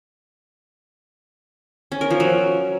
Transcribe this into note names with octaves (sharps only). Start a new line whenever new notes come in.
C#4
A#4
F3
F#3